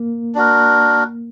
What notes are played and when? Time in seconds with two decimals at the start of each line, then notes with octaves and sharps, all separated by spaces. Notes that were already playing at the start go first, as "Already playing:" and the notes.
Already playing: A#3
0.35 D4 F#4 A#4